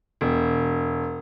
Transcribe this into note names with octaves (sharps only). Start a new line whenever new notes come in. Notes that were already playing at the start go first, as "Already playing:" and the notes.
E1